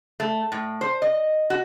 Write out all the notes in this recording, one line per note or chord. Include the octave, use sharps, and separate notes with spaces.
A3
A2
C5
D#5
F#4